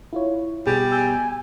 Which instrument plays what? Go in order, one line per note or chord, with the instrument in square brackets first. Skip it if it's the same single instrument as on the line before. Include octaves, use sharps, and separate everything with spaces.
[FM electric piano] E4 F4 C#5
[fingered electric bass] B2 [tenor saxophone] G3 [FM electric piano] G#4
[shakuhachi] G#5 [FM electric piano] E6 G6